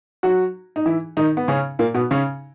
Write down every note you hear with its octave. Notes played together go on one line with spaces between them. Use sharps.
F#3 F#4
D#4
E3 E4
D#3 D#4
B3
C#3 C#4
A#2 A#3
B2 B3
C#3 C#4